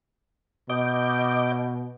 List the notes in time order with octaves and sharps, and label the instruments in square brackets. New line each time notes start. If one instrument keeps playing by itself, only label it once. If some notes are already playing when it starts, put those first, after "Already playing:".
[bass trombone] B2 [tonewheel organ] D#5 D6 G6